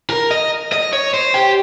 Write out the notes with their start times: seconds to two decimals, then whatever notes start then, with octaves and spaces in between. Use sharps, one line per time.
0.10 A#4
0.31 D#5
0.72 D#5
0.93 C#5
1.14 C5
1.34 G4